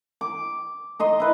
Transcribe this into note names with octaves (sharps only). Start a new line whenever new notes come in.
D6
D#4 D#5 C6
E4 B4